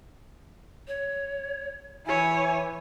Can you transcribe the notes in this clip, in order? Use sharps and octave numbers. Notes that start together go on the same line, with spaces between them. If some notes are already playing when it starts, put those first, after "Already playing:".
C#5
E3 E4 C#5 G#5